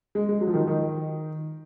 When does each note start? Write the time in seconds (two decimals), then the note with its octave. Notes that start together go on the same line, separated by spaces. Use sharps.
0.15 G#3
0.29 G#3
0.41 F#3
0.48 F3
0.54 D#3
0.67 D#3